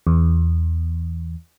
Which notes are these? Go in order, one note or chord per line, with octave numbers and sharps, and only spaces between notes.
E2